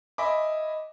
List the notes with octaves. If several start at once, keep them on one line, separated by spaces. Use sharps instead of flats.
D#5 E5 G#5 B5 D6